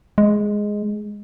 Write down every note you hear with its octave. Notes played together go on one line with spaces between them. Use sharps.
G#3